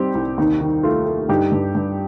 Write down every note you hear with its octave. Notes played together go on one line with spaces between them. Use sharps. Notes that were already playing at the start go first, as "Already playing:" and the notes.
Already playing: G3 C4 D#4 G4
C2
D#2 D#4
D#3
A3 F4
A3
G2 D#4 G4
G2
G2